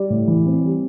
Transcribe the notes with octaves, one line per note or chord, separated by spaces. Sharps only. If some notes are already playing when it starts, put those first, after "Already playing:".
Already playing: G3 D5
A2
E3
C4
G3